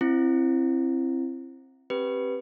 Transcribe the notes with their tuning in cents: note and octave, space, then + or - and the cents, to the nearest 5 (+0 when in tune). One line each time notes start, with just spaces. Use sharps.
C4 +25 E4 +30
C4 +30 G4 +0 B4 +0